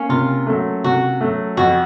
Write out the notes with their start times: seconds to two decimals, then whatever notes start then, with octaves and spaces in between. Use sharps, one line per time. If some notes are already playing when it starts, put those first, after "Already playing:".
Already playing: A#3 C#4
0.09 C3 F4
0.47 F#3 A3
0.84 C3 F#4
1.21 F#3 A3
1.57 F2 F#4